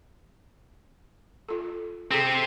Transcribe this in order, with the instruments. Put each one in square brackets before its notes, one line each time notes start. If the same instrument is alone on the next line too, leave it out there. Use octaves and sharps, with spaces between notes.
[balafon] F4 A4
[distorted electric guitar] C3 C4 [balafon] G#4 A4